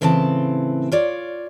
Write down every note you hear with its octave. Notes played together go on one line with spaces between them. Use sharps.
A2 C#3 E3 C4 E5 A5
F4 C#5 D5